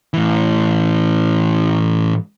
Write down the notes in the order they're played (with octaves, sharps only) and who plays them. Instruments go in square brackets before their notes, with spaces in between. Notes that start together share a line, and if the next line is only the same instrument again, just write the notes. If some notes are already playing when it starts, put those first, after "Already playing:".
[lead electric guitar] A2 E3